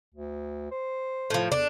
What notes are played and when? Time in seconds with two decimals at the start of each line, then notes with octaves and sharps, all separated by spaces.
0.14 D2
0.71 C5
1.30 A2 F3
1.52 E2 D4